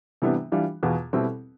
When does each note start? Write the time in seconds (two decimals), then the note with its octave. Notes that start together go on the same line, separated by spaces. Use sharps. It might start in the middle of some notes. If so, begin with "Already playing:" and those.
0.22 C3 E3 G3 B3 D4
0.52 E3 G3 D4 F4
0.83 E2 B2 B3 F4
1.13 B2 G3 C4 E4 A4